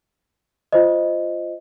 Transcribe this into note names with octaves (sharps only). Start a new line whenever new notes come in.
F4 C5 D#5